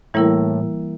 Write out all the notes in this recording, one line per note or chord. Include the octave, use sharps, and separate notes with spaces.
A2 E3 G3 A#3 E4 A#4